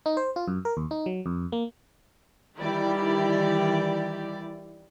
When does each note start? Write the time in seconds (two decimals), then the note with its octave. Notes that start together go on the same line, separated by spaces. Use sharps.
0.06 D#4
0.17 C5
0.36 F4
0.48 F#2
0.65 A#4
0.77 D#2
0.91 D#4
1.06 F#3
1.26 F2
1.52 A#3
2.59 D#3 E3 G3 E4 G4 D5